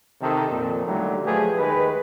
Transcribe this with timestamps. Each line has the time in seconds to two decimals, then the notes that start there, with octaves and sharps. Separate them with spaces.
0.20 C3 D#3 A4
0.49 F2 A#2
0.84 A#2 D3 D#3 F#3 G3 A3
1.24 F3 F#3 A3 G4 G#4 B4
1.57 D#2 D#3 G#3 B4